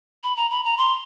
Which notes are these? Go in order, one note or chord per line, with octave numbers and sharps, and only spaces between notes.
B5
A#5
B5
A#5
C6